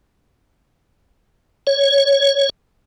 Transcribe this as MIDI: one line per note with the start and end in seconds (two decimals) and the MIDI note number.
1.67 2.49 73